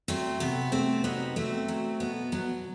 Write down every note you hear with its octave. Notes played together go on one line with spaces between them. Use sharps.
F#3 A3 C4
C3 B3
C3 A3 C4
F#3 B3 D#4
F#3 A3 C4
F#3
B2 B3
F#3 B3